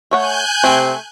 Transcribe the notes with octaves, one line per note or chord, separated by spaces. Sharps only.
A3 C#5 F#5 G#5 F#6 G6
C3 A3 C4